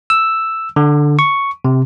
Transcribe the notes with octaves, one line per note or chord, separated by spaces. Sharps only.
E6
D3
C#6
C3